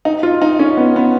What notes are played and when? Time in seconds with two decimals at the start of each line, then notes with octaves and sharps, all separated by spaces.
0.05 D#4
0.23 F4
0.42 D#4
0.59 C#4
0.77 B3
0.96 B3